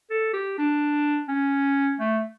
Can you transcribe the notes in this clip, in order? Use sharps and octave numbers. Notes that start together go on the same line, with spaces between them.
A4
G4
D4
C#4
A3